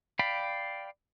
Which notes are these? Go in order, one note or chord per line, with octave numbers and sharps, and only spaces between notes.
D5 F5 G5 B5